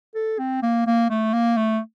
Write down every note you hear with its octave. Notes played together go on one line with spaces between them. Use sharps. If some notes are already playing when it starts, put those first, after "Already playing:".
A4
C4
A#3
A#3
A3
A#3
A3